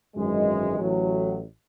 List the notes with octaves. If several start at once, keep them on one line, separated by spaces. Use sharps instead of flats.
G#1 F#2 E3 G#3
A1 A2 F#3